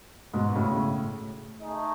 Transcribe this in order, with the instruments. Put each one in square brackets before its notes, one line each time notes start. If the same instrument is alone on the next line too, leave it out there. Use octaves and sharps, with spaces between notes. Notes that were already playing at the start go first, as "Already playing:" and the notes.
[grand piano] G#2 B2
A2 C#3
A2
[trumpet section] A3 D#4 G#4 D#5